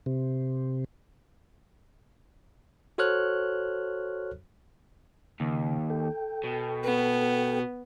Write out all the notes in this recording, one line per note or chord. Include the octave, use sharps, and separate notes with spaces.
C3
F#4 A4 C5 C#5 F6 F#6
D#2 C#3
A4 G5
B2
B3